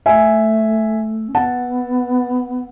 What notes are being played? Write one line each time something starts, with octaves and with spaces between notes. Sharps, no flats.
A3 E5 G#5
C#4
B3 F#5 A5